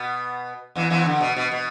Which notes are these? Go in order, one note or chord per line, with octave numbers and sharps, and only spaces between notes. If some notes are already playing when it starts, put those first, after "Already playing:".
Already playing: B2 B3
E2 E3
E2 E3
D3
B2
B2
B2